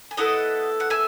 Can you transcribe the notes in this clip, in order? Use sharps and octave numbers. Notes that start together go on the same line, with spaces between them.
G#5
B3 E4 A4 D#5 F#5
F#5
E5 G#5